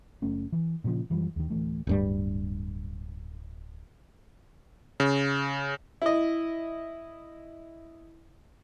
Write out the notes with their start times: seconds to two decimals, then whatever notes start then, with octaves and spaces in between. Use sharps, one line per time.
0.22 F#1 A3 C#4
0.52 E3
0.84 A#2 C#3 E3 F3
1.10 F#2 E3 F3 G3
1.36 D#2 D#3
1.50 D1 E3 A3
1.87 D1 G2 G3
5.00 C#3
6.02 E4 D#5